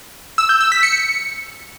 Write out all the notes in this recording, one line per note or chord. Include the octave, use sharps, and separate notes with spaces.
E6
G6
E6
B6
C#7